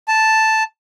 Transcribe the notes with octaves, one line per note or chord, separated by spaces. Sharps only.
A5